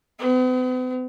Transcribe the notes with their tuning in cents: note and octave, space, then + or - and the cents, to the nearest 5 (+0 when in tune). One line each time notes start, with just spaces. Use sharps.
B3 +45